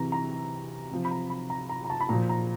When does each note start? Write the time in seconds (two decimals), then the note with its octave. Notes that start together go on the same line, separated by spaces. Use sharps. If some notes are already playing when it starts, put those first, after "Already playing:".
Already playing: C3 E3 A#5
0.12 A#5
0.91 C3 F3
1.05 B5
1.11 A#5
1.30 B5
1.50 A#5
1.69 A#5
1.85 A#5
1.90 A5
2.01 B5
2.09 A#2 F3 A#5
2.29 A#5